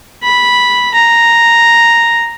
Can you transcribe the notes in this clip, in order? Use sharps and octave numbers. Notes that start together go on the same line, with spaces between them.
B5
A#5